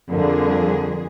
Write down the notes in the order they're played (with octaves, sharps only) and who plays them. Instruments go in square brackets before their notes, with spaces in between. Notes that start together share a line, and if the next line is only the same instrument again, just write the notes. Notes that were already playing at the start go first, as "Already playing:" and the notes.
[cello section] F2 G3 G#4 [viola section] D3 [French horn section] F4 A#4